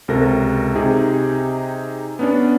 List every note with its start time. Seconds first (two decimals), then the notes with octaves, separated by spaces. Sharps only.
0.08 C#2 C3 A4 A#4 A#6
0.75 C3 D#4 G4 G#4
2.19 B3 C#4 D4